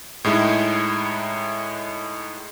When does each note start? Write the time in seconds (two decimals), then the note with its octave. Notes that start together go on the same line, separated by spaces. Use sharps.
0.24 A2 G#3 D#4 E4